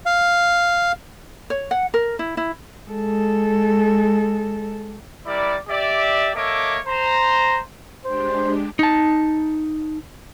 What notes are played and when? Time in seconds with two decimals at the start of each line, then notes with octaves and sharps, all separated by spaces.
0.06 F5
1.50 C#5
1.71 F#5
1.94 A#4
2.19 E4
2.37 E4
2.89 G#3 A4
5.26 G3 E4 A#4 D5
5.69 G4 D5 E5
6.36 A#3 A4 C#5 D#5 E5 D6
6.87 C5 A#5
8.05 G#3 D4 G4 C5
8.79 D#4 A5